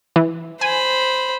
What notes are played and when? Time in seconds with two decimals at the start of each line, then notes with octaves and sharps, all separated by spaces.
0.16 E3
0.61 C5 G#5 B5